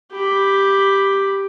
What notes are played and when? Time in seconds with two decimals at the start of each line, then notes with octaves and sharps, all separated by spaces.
0.12 G4 B5